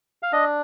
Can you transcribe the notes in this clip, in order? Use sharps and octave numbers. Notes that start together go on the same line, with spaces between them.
F5
D4 D#5